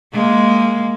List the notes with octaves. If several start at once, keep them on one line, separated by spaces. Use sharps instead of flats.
G#3 A#3